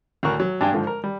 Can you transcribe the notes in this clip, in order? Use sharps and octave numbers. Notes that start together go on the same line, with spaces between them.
D2 A2 F#4 A#4 C#6 F#6
F#3
G2 D4 G5 G#5
G#2 D3 F3
A#4
G3